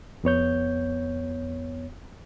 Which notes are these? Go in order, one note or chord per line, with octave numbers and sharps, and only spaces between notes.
F2 B3 C#5 G6